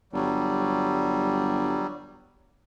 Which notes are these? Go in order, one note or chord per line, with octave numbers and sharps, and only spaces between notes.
G1 F#3 G3